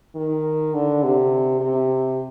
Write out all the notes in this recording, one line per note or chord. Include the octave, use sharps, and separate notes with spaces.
D#3
D3
C3
C3